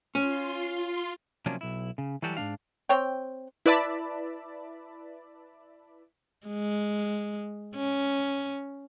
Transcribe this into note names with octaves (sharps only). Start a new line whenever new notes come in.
C#4 F4 C6
C3 F3 F#3 A#3 C#4 D4
B1 E4
C#3
E3 F#3 G3 F#4 G4 A4
G#2 D#3 D4 F5
C4 C#5 G5
E4 B4 D5 E5 A5 B5
G#3
C#4